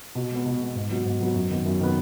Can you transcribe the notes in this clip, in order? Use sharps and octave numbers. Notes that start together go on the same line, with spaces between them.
B2
G#3 B3
B2
G#3 B3
G#2
F#3 B3 F#4
G#2
F#3 B3 F#4
F#2
D#3 B3
F#2
D#3 B3